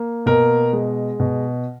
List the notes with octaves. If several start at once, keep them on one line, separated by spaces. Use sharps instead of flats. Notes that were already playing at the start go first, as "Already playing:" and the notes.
Already playing: A#3
B2 A#4
G#3
B2